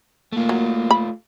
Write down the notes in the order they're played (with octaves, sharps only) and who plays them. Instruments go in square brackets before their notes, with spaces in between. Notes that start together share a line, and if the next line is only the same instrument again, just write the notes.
[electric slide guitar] A3 F4 [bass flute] A#3
[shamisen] F#3
B5